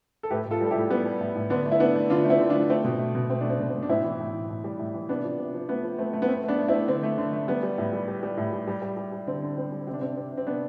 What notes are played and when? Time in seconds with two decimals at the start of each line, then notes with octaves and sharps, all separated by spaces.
0.23 A4
0.30 A2 G4 B4
0.46 A2
0.51 F4 A4
0.61 G3
0.66 A4
0.71 E4 G4
0.76 A2
0.90 G3 B3
1.06 G3
1.20 A2
1.35 A2
1.50 D3 B3 D4
1.66 A3
1.72 E4
1.80 A3 B3 D4
1.95 A3
2.10 D3 D4 F4
2.25 A3
2.30 C4 E4
2.40 D3
2.50 D4 F4
2.55 A3
2.70 A3 C4
2.84 B2
2.99 A3
3.15 B2
3.30 A3 C4
3.41 A3 D4
3.50 C4
3.60 B2
3.69 C4
3.75 B2
3.83 D4
3.89 A2 C4 E4
4.04 E3
4.20 A2
4.34 A2
4.49 A2
4.64 G3
4.79 A2
4.94 E3
5.09 C3 B3 D4
5.24 F3
5.38 C3
5.53 F3
5.68 A3 B3
5.83 F3
5.98 A3 C4
6.13 A3
6.22 B3
6.28 A3 C4
6.44 A3 B3 D4
6.58 A3
6.68 C4 E4
6.73 A3
6.88 D3 C4
7.03 A3
7.18 D3
7.33 A3
7.48 G3 B3
7.63 G3
7.78 A2
7.93 G3
8.08 G3
8.23 G3
8.37 A2
8.53 G3
8.67 G3
8.82 G3
8.97 G3
9.12 G3
9.27 D3 C4
9.42 D3
9.57 G3 C4
9.72 G3
9.87 C3 C4
9.94 D4
10.01 C3 C4
10.17 C3
10.32 C3
10.37 C4
10.47 C3 B3 D4